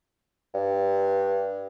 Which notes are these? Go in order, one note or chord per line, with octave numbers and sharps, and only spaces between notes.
G2